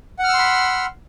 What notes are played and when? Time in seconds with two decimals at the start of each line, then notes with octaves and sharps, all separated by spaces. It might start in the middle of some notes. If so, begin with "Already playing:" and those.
0.19 F#5
0.24 F6
0.29 E6
0.34 C6
0.39 B5